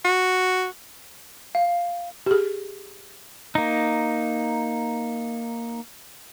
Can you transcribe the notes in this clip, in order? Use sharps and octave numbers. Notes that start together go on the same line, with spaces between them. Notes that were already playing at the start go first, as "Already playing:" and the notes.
F#4
F5
G4 G#4
A#3 D#4